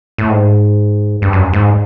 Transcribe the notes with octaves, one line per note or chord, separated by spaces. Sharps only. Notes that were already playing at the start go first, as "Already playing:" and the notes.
A2
G#2
G2
F#2
G#2